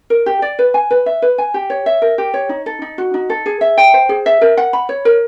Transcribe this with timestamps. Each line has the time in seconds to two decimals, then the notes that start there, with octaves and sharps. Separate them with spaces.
0.10 A#4
0.26 G4
0.42 D5
0.59 B4
0.74 G#5
0.91 B4
1.06 E5
1.22 B4
1.38 G#5
1.54 G4
1.70 C#5
1.86 E5
2.02 A#4
2.18 G4
2.34 C#5
2.49 D#4
2.66 A4
2.82 D#4
2.98 F#4
3.14 D#4
3.30 A4
3.46 G#4
3.61 E5
3.78 G5
3.94 C5
4.09 G#4
4.26 E5
4.41 A#4
4.57 F#5
4.73 B5
4.89 C#5
5.05 A#4